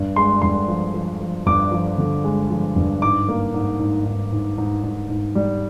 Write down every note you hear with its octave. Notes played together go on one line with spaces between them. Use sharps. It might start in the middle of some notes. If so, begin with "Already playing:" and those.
Already playing: G2
G#3 C6
G2 C6
F3
F3
F3
G2 D6
F3
D3
G#3
F3
G2
G#2 D6
A#3
G#2
G#2
G#2
G#2
G#2
G#2
G#2
G3